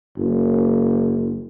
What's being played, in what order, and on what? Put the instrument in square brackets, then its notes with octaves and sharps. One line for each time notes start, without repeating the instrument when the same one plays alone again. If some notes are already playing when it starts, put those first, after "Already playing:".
[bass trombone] F#1